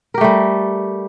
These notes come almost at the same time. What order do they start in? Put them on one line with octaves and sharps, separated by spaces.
A#4 G4 A3 G3